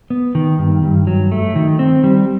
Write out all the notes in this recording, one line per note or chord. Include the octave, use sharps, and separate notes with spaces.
B3
D#3
G2
G2
F#3
A3
D#3
C4
G3